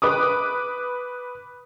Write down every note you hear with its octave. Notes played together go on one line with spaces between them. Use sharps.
B4 D6 D#6